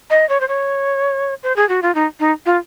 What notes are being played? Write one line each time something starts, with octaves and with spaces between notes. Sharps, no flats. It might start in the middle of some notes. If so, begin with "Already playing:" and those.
D#5
C#5
C5
C#5
C5
G#4
F#4
F4
D#4
D#4
F4